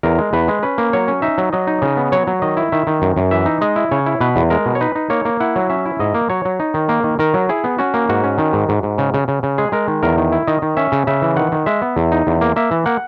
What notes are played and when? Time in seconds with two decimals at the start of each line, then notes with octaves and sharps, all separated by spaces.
0.03 E2 A#4
0.18 G#3
0.33 E2 B4
0.48 G#3
0.63 C#4 B4
0.78 A#3
0.93 F#3 C#5
1.08 C#4
1.22 D#4 E5
1.38 F#3
1.53 F#3 D#5
1.67 D#4
1.82 C#3 D#5
1.97 B3
2.12 F#3 C#5
2.27 F#3
2.42 D#3 D#5
2.57 E4
2.72 D#3 E5
2.87 D#3
3.02 F#2
3.17 F#2
3.31 E3 E5
3.46 D#4
3.61 G#3 D#5
3.76 E4
3.91 C#3 C#5
4.06 E4
4.21 B2 B4
4.36 E2
4.50 G#3 A#4
4.66 B2
4.75 C#5
4.81 D#4 B4
4.95 D#4
5.10 A#3 C#5
5.25 A#3
5.40 E4 F#5
5.56 F#3
5.70 C#4 E5
5.85 E4
5.99 G#2 D#5
6.14 A#3
6.30 F#3 C#5
6.45 F#3
6.60 D#4
6.74 D#3
6.89 A#3
7.04 D#3
7.19 D#3 A#4
7.34 F#3
7.49 E4 G#4
7.64 B3
7.78 C#4 F#4
7.94 A#3
8.09 G#2 F#4
8.23 C#4
8.38 D#3
8.53 G#2
8.69 G#2
8.83 G#2
8.98 C#3
9.14 C#3
9.28 C#3
9.43 C#3
9.58 G#3 G#4
9.72 G#3 A#4
9.88 D#3
10.03 E2 A#4
10.18 D#3
10.32 E4
10.47 D#3 D#5
10.62 D#3
10.77 C#4 E5
10.92 C#3
11.07 C#3 E5
11.22 E3
11.36 D#3 F#5
11.52 D#3
11.66 G#3 E5
11.82 B3
11.96 E2
12.12 D#4
12.27 E2
12.41 A#3
12.56 A#3 E5
12.71 E3
12.86 A#3 F#5